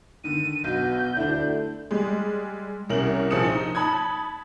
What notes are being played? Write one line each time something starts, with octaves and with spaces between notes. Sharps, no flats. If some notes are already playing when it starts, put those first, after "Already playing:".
D3 D#3 D#7
B1 B2 G6
D2 D3 D4 E4
G3 G#3
C2 C#4 A#4 F#7
A#1 F3 G#4 D#6 C#7 E7
D#4
A5 B5 D#6 G#6